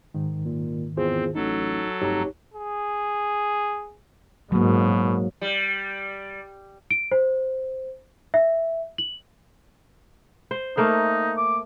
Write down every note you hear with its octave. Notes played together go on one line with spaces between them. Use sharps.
G#2 D#3
A#2
E2 C4 F4 G#4 C5
A1 F#3 D#4 A4
F1 G2 D#4 G4 C#5 A#5
G#4
G#2 B2 F#3 A#3
G3
D7
C5
E5
F#7
C5
A3 A#3 D#4 F5
D6